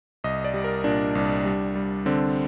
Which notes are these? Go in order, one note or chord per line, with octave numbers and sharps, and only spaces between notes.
C2 D#5
D5
G3
A#4
A#2 D4
C2
G3
G3
D3 C4